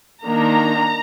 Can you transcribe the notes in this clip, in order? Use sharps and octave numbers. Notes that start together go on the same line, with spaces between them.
D#3 A#3 D4 A#5